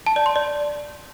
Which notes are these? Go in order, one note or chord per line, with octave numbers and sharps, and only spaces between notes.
A5
D5
C6
D5